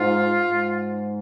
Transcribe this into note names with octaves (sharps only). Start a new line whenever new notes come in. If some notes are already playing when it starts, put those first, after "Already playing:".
Already playing: G#2 F4
G#2